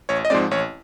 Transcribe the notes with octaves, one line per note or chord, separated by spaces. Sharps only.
A1 C#5
D#5
G#2 F3 G#3 C4 D5
A1 C#5